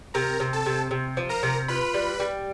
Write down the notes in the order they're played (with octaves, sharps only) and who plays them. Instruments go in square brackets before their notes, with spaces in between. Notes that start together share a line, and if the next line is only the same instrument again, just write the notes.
[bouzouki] C3 [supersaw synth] A#4 A#5
[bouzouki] C3
[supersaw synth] A4 A5
[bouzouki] C3
C3
F3
[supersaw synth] A#4 A#5
[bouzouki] C3
[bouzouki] F4 [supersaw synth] B4 B5
[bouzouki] G3
G3